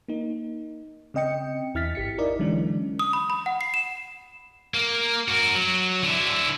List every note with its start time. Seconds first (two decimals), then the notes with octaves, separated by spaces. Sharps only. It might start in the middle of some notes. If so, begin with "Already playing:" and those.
0.08 A#3 D#4
1.14 C#3 C4 D#5 G5 C#7
1.75 E2 E4 F6 A6 B6
1.95 G#1 G4 B6 C#7
2.18 D#4 E4 A#4 D5 D#5
2.39 D3 E3 F#3 G#3 C#4 D4
2.99 D#6
3.13 B5
3.30 B5
3.46 F#5
3.61 C7
3.74 E7
4.74 A#3
5.28 F#4 A#4
5.55 F#3
6.03 D3 E4